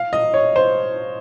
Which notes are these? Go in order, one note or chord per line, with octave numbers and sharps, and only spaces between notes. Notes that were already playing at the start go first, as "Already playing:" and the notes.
Already playing: F5
D#5
C#5
C5